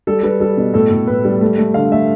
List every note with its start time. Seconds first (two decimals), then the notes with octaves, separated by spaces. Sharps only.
0.07 G3 A4
0.23 G3 B4
0.40 G3 A4
0.57 B2
0.74 A2 A4
0.91 A2
1.07 A2 B4
1.25 G3
1.41 A3
1.58 A3
1.74 D3 F5
1.92 A3 E5